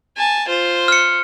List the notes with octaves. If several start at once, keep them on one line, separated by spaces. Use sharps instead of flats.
G#5 A5
F4 C5
F6 C#7